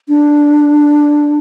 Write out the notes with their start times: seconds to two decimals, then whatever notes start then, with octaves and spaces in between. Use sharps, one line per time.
0.09 D4